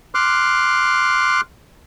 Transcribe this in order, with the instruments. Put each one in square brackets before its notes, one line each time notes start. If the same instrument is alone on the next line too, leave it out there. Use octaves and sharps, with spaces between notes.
[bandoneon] C6 D6 F6 F#6